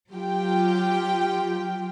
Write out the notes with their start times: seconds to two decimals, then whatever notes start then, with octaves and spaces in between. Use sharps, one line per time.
0.14 F#3 F4 G4 G5